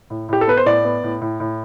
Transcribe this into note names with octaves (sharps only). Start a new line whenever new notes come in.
A2
A2 G4
A4
B3 B4
C5
A2 D5
B3
A2
A2
A2